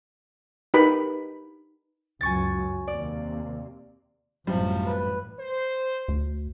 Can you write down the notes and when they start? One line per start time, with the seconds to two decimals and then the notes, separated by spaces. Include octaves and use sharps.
0.74 D#4 G4 A#4 B4 B5
2.21 C#2 F#2 F#3 G#5 C#6 A6
2.87 D#2 C3 A#3 D5
4.47 A1 F#2 C3 F3 G3
4.86 B4
5.39 C5
6.08 D2